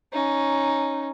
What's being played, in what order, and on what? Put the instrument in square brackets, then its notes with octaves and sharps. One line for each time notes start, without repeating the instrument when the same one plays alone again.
[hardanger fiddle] C#4 D#4